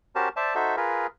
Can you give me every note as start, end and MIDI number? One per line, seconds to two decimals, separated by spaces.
0.15 0.29 61
0.15 0.29 66
0.15 0.29 67
0.15 0.29 70
0.15 0.29 72
0.15 0.29 81
0.36 0.55 72
0.36 0.55 74
0.36 0.55 76
0.36 0.55 81
0.55 0.76 63
0.55 0.76 66
0.55 0.76 69
0.55 0.76 72
0.55 0.76 76
0.77 1.07 65
0.77 1.07 68
0.77 1.07 70
0.77 1.07 71